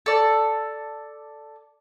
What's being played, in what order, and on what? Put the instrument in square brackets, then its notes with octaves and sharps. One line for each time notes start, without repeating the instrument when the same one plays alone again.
[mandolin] A4 D5